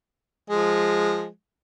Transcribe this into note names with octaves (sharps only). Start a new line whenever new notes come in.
F3 G#3